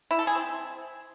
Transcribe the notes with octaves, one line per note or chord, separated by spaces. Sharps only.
E4
A4
G#4
C4